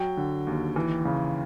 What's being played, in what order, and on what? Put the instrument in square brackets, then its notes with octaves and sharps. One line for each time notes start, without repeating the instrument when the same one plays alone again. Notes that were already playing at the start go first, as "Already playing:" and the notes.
Already playing: [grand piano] F#3 G5
D3
D#2
E3
C#3